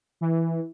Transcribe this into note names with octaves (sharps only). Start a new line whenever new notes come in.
E3